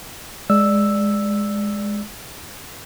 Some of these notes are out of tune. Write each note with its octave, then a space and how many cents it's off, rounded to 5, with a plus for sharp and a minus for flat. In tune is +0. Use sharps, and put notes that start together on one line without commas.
G#3 +0 D5 +0 E6 +0